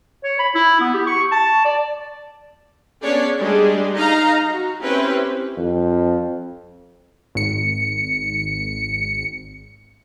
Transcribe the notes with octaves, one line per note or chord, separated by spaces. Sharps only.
C#5
B5
E4
B3
G4
C#6
A5
D5
B3 C#4 D4 G#4 C#5 D5
G3 G#3 D4 G#4
D#4 D#5 F5 A#5
F#4
C4 C#4 E4 G4 B4 C5
F2
G#1 C#7